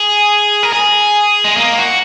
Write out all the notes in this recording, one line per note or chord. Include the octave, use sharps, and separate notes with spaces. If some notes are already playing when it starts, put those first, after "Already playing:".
Already playing: G#4
A#4
G#4
G#3
A#3
F#4